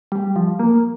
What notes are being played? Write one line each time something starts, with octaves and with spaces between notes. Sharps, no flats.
G3
F3
A#3